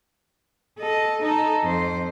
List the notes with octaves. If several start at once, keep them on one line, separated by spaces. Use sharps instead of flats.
A4 D#5
D#4 A4
F2 C5